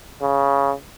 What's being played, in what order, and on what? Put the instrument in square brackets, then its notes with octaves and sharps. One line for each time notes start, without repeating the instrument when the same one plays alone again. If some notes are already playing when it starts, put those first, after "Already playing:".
[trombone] C#3